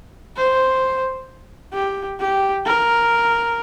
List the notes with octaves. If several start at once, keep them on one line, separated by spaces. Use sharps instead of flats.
C5
G4
G4
A#4